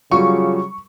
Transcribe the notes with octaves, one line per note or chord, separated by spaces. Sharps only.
C#3 F#3 G3 F4 C#6